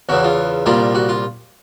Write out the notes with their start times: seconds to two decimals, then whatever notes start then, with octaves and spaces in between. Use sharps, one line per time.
0.09 E2 C#3 E3 F#4
0.24 F4
0.66 C2 A#2 G3 A#3 F4
0.95 F#4
1.09 F4